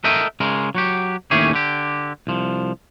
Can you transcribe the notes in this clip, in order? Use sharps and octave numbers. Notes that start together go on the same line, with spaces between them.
A4 A#4 D#5 E5 G5
C#3 G#3 A#4
F#3 F#4 G4
D#2 A2 A3 C#4 G4 G#4
D3 G4
C2 F3